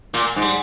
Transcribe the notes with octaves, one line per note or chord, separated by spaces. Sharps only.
A#2 A#3
G#2
G3